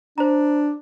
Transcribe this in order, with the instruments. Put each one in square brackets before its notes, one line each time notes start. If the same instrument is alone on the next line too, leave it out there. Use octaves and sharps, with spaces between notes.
[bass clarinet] D4 [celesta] C5 A#5